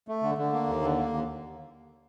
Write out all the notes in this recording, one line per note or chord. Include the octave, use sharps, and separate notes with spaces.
A3
D3
D3
A#3
D#2
D3
A#3
D#2